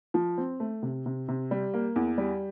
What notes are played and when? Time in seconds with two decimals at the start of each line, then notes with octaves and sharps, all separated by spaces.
0.14 F3
0.38 C4
0.60 A3
0.83 C3
1.06 C3
1.28 C3
1.51 G3
1.74 A#3
1.96 E2
2.18 G3